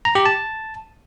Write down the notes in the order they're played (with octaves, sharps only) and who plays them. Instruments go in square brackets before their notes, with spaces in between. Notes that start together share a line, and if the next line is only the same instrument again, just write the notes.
[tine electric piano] A#5
G4
A5